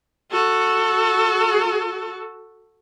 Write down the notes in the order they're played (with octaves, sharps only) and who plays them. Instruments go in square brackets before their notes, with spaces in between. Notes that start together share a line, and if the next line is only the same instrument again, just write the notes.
[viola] F#4 A4